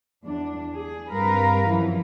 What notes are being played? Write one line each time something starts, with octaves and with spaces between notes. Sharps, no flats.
E2 D4
G#4
G2 C4 A#4 B4 F5
F#2 E3 F3